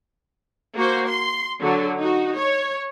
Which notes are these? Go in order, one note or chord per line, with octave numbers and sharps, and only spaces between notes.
A#3 F#4 C5
C6
D3 F#3
D#4 F#4
C#5